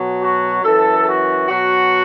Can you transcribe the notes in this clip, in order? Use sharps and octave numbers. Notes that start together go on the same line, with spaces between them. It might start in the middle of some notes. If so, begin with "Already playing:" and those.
Already playing: B2 F#3
F#4
F#2 E3 A4
F#4
B2 F#3 F#4